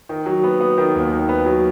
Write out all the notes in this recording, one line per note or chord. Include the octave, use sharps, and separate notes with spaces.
D#3
F#3
B3
B3
D#3
D#2
D#3
B3
F#3